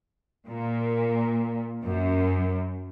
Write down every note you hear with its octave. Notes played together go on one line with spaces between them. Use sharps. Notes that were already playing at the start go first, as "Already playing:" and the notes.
A#2
F#2